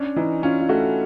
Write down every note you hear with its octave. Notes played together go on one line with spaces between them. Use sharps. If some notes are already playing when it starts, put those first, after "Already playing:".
Already playing: C#4 D4
E3 D#4
C#4 F4
F4
A3 F#4